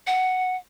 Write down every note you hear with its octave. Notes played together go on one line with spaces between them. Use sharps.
F#5